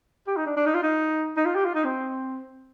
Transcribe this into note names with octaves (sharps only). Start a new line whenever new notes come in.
G4
D#4
D4
D4
D#4
F4
D#4
D#4
F4
G4
F4
D#4
C4